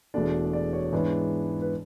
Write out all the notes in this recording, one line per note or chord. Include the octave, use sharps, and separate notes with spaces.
E1 E2 B2 A3 D4 D5
D5
C#5
G#2 E3 B3 D4
B4